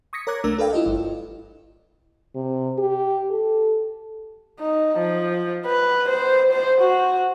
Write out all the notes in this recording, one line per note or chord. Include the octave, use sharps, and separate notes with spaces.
C#6 D#6 G#6 A#6 B6 C#7
A#4 C#5 A#5 D6 F#6 G#6
C2 A3 D4 A#4 E6
A4 B4 D5 F5 G5
E4 F4 G4 D#5
G1 G2 E4
C3
G4
A4
D#4
F3
B4
C5
C5
F#4